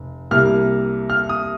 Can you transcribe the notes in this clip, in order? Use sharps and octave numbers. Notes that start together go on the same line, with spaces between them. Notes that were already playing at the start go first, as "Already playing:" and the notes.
Already playing: F1
C2 C3 G3 A#3 F6
F6
D#6